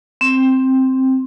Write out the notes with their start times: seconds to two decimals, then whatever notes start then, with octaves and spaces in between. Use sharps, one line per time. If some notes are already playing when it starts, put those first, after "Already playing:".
0.21 C4